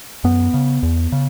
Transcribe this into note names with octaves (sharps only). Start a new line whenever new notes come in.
F#2 B3
C#3
E2
C#3